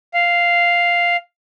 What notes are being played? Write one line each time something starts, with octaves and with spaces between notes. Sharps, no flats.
F5